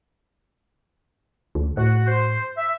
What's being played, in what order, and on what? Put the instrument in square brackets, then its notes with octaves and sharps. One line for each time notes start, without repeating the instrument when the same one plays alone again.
[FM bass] D2
[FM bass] A2 [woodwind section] F#4 F#5
[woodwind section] C5
E5